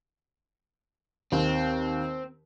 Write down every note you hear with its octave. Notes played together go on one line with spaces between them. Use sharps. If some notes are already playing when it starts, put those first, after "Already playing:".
D#2 C4